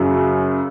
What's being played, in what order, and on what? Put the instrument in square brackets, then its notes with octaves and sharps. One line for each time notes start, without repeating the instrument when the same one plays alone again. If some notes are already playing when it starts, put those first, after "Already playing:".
Already playing: [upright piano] F#2 C#3 F#3